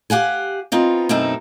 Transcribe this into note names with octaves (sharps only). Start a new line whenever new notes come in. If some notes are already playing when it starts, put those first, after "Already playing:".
G4 F5 F#5 G#5
B3 C4 D#4 F4
F#2 B2 A3 C4 D#4 E4